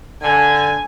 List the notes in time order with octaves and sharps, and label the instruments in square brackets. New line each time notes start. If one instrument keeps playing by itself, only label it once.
[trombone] D3 [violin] G#5